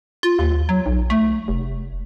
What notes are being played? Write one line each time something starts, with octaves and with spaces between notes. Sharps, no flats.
F4
D#2
F#3
B1
A3
F1